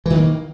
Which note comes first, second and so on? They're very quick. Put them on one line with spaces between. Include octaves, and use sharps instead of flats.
E3 D#3 A#3